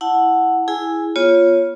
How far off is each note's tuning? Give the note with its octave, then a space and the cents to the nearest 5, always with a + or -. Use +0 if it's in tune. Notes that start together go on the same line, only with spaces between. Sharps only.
E4 +0 F#5 +0 A5 +0
E4 +0 G#4 +0 G#5 -10
B3 -30 F4 +0 C#5 +0